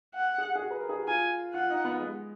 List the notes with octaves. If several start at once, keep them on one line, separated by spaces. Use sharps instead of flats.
F#5
G#4
G#4
F#4
B4
A#4
G#4
F#4
F4 G#5
F4 F#5
D#4
B3
G#3